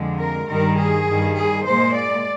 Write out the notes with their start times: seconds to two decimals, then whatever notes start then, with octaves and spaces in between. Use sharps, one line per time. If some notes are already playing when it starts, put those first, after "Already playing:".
Already playing: F2 D3 F3 G#3
0.19 A#4
0.48 G2 D#3 G3 A#4
0.78 G#4
1.07 G2 D#3 G3
1.36 G#4
1.65 A#2 G#3 C5
1.96 D5